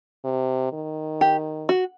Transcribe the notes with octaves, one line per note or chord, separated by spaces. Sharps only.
C3
D#3
G4
F#4